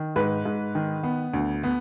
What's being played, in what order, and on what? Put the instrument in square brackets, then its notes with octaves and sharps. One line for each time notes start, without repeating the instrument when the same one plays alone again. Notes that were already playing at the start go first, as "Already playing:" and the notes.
Already playing: [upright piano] D#3
G#2 B4
G#2
D#3
B3
D2
B3